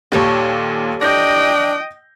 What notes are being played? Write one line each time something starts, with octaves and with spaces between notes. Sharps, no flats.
D#2 A#2 G3 A4 C#5
D4 D#5 G5 G6 A#6